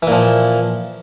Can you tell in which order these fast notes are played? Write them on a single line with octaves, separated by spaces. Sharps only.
E3 A#2 F3